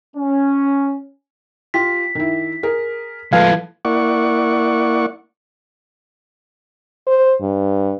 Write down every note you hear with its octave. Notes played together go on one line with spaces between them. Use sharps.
C#4
F4 G4 B6
D#3 E4
G#4 A#4
F3 G#3 A3 B4 F5 A5 G#6
A#3 E4 D5 F#5 C#6
C5
G2